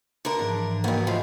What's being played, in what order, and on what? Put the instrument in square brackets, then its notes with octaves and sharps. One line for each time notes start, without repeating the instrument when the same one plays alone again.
[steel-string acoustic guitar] D3 A#4
[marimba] G#2 E3 F3 [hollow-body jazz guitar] D4
[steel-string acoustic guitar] G2 B3 [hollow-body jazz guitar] A#3 D#4 F#4
[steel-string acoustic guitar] F3 [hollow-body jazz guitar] A3 C#4 F4 [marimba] G4 D#5